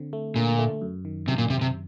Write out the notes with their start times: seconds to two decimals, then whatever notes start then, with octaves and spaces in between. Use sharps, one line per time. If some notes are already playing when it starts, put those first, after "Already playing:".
Already playing: D3 C4
0.13 A3
0.36 A#2 D3
0.59 A3
0.82 F#2
1.05 D#3
1.27 F#2 C3
1.38 A#2
1.50 F#2 C3
1.61 C3